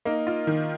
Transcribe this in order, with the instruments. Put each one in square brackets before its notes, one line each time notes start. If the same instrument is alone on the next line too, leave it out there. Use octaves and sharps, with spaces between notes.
[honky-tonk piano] A#3 [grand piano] D#4
[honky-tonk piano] F4
D#3